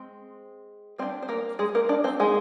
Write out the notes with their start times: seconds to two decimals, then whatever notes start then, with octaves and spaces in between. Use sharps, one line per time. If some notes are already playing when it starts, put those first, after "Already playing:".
Already playing: G#3 C4
0.98 G3 C4 D4 C5
1.22 C5
1.29 A#3 A#4
1.59 G#3 G#4
1.75 A#3 A#4
1.89 D4 D5
2.04 C4 C5
2.19 D#3 G#3 A#3 D#4 G#4